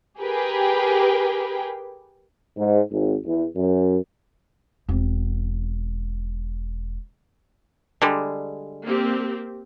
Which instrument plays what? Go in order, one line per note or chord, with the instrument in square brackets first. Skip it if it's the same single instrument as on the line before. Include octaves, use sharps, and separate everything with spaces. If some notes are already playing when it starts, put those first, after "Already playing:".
[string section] G4 G#4 A#4 B4 G5
[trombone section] G#2
G#1
E2
F#2
[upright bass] E1 C4
[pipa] D3 G3 G#3
[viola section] A#3 C4 G4